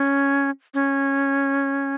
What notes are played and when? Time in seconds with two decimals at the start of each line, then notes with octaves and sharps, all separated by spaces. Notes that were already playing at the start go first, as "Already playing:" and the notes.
Already playing: C#4
0.74 C#4